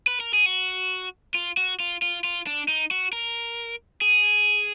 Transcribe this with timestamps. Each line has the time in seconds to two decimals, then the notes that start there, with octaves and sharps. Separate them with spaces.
0.07 B4
0.20 A#4
0.34 G#4
0.46 F#4
1.34 F4
1.57 F#4
1.80 F4
2.02 F4
2.24 F4
2.47 D4
2.68 D#4
2.91 F#4
3.13 A#4
4.02 G#4